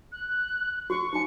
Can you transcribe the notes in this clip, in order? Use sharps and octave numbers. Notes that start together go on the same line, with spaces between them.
F#6
F#4 C#6
D#4 G#5 C#7